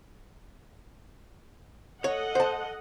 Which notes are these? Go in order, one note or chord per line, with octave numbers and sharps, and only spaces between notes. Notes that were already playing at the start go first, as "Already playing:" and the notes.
A4 C#5 D#5 F#5
C5 A5